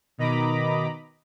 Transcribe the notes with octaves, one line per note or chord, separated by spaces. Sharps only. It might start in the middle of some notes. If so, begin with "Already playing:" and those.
B2 D#3 D#5 A#5 B5 D6